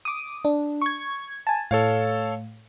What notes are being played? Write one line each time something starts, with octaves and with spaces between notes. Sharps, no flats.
D6 D#6
D4
C#6 G#6
G#5 A5
A2 A4 C#5 F5